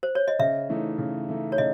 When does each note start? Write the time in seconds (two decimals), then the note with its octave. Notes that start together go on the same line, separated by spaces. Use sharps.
0.03 C5
0.15 C#5
0.28 D#5
0.39 C#3 E5
0.69 E3 A3 D#4
0.98 C#3
1.28 E3 A3 D#4
1.52 C#5
1.58 C#3 D#5